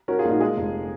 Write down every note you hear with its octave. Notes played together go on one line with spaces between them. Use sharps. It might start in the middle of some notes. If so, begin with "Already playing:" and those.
C#4 F#4 A#4
F4 G#4
A#1
D#4 F#4
G#3 F4 G#4
F1